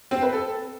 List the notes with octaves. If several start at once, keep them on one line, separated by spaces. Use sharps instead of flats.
C4
B4
A4